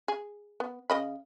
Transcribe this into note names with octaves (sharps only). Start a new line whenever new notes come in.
G#4
B3
C#3 D#5 B5